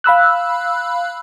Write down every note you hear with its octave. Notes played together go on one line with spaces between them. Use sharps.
F5 B5 E6 F#6